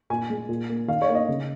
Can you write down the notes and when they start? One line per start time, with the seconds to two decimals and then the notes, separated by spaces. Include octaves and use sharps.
0.10 A#2 G#5
0.30 G#3
0.49 A#2
0.69 A#3
0.88 D#3 F5
1.01 C#5
1.09 A#3
1.15 D#5
1.28 C#3